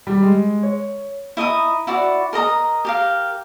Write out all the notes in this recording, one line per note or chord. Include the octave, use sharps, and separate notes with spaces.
G3
G#3
C#5
E4 D#5 A#5 D#6
E4 F#4 D5
A#4 D#5 A#5 D#6
G4 A#4 F5